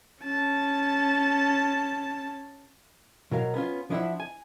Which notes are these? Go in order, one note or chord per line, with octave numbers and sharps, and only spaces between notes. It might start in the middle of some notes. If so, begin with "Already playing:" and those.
C#4 A5
B2 F#3 A#4 F5
B3 C#4 D4 F4
F3 D4 E4 B4 E5 F#5
G#5